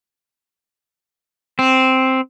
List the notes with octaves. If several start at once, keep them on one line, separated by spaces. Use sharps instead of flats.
C4